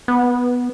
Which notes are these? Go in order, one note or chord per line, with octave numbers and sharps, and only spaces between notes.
B3